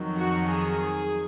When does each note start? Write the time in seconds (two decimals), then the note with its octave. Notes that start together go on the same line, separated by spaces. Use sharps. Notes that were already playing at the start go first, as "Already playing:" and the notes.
Already playing: F2 D#3 F#3
0.17 F#4
0.49 G#4